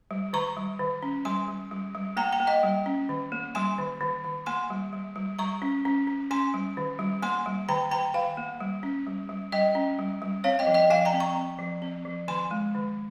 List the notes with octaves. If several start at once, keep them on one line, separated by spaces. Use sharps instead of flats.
G3
D#3 A#5 C#6
G3
D#3
C#4
G3 G#5 C6
G3
G3
G3
A#3 G5 A#5
G5 A#5
A#3
D#5 G5
G3
C#4
D#3
A#3
G3 G#5 C6
D#3
D#3
D#3
A#3 G#5 C6
G3
G3
G3
G3 A#5 C#6
C#4
C#4
C#4
C#4 G#5 C6
G3
D#3
G3
A#3 G#5 C6
G3
D#3 G5 A#5
D#3 G5 A#5
D#3 F5 G#5
A#3
G3
C#4
G3
G3
G3 D#5 G5
C#4
G3
G3
C4 C#5 F5
D#5 G5
F3
D#5 G5
F3 F5 G#5
G5 A#5
C4
A#5 C#6
C4
F3
C4
F3
D#3 G#5 C6
G#3
D#3